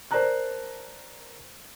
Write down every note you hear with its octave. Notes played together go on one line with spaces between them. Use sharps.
A#4 C5 D5 A5 A#5 F#6